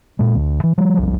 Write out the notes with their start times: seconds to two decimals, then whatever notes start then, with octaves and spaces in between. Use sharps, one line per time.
0.19 A#2 G#3
0.35 D2
0.64 E3
0.78 F3 G3
0.97 F#1 C2 F#3